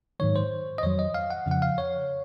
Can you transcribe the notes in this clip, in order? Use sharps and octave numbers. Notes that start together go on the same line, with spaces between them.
G#2 D#3 F#3 C#5
C5
D#5
F2 D#3 F#3 C#5
D#5
F5
F#5
F2 C#3 F3 F#5
F5
C#5